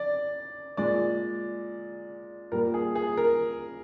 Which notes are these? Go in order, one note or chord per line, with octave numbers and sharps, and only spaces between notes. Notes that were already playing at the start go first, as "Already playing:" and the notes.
Already playing: D5
A#2 G#3 D5
A#2 G3 A#3 A#4
G#4
G#4
A#4